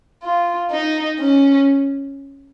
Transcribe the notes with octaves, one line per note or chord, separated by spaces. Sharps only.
F4
D#4
C#4